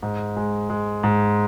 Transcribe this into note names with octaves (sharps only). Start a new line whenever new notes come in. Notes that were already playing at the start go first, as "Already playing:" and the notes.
G#2
G#3
G#3
G#2